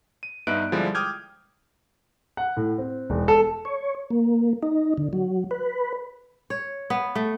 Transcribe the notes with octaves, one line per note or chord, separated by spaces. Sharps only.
D#7
G2 B3 D#4 E5 F#6 D7
D3 F3 G3 G#3 E4
G5 D6 D#6 F6 G6 G#6
F#5
A2
C4
E1
A4
C#5
A#3
D#4
D3
F#3
B4
C#5
B3
A3